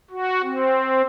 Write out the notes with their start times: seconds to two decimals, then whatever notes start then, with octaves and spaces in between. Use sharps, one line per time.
0.10 F#4
0.43 C4